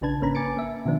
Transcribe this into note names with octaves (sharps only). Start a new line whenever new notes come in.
A#1 C#3 D4 B4 A5 G#6
G#1 A#3 C#4 B4 A#5 B5
G#5 D6 A6 C#7 D7
A#3 E5
B2 D#3 F3 B3 D4